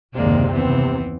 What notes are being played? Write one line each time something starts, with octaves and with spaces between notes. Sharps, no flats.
F#1 D#2 C3 G#3 A#3 D5
D#2 E3 B3 C4